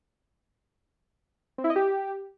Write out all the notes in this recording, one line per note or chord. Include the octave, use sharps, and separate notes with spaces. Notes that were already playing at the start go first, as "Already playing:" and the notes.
C4
E4
D#5
G4